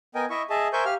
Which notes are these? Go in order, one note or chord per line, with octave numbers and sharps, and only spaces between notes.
B3 A#4 D#5 G5 G#5
E4 D#5 E5 C#6
G#4 D#5 E5 A5
A#4 C5 E5 G#5 C#6 G6
G4 F5 F6